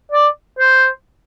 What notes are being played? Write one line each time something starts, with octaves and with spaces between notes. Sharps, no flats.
D5
C5